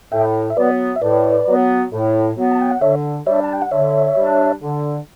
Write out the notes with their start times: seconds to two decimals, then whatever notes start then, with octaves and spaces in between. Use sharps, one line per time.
0.12 A2 E5 G5
0.50 E5
0.57 F#3 B3 B4 D5
0.96 E5
1.02 A2 B4 D5
1.47 F#3 B3
1.92 A2
2.37 F#3 B3
2.51 A5
2.61 G5
2.71 F#5
2.81 D3 C#5 E5
3.26 G3 D4 C#5 E5
3.44 A5
3.53 G5
3.62 F#5
3.71 D3 C#5 E5
4.16 G3 D4
4.61 D3